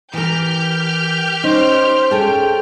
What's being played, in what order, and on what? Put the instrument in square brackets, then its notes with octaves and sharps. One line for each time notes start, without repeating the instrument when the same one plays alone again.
[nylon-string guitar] E3 A#4 [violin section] G4 F6 G6
[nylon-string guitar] C#4 D#4 [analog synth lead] C5
[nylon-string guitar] C#4 G#4 A4 [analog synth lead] G5